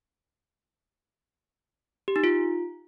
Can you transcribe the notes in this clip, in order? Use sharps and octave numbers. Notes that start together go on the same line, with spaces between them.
G4
D#4
F4